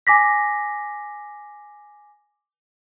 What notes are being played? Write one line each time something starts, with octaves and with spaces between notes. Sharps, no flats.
G#5 D6 A#6 B6